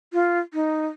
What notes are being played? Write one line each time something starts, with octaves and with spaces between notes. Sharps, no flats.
F4
D#4